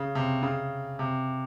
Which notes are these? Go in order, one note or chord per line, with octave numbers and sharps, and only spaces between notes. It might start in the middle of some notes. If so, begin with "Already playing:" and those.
Already playing: C#3
C3
C#3
C3